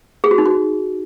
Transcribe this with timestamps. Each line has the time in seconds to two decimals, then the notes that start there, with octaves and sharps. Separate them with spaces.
0.24 G#4
0.31 F#4
0.38 D#4
0.46 F#4